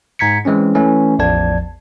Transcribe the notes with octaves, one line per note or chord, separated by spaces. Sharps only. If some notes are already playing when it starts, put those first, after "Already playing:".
G#2 A#5 G#6 B6 C#7
E3 G#3 C4 C#4
E3 A3 C#4
A1 E2 F3 D5 A5 G#6